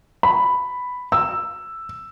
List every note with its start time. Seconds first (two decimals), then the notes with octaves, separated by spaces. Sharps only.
0.23 B5
1.12 E6